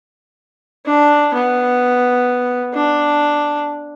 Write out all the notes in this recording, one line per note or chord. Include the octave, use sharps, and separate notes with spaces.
D4
B3
D4